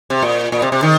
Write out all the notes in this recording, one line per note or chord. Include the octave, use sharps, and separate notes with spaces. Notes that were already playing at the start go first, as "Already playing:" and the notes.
C3
A#2
A#2
C3
C3
D#3